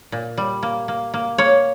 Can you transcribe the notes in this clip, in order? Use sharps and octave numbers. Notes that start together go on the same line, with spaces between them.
A#2
G3
A#3
A#3
A#3
A#3 C#5